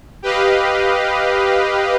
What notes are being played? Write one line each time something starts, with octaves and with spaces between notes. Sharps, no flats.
G4 B4 D#5 F5